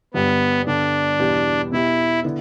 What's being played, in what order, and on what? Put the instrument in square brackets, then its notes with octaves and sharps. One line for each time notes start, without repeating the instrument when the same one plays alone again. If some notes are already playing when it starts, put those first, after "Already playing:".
[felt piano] G1 G2 G3 [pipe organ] B3
[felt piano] G2 D3 G3 B3 [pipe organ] D4
[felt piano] E2 B2 G3 B3 G4
[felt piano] B2 B3 G4 [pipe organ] E4
[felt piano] D3 B3 E4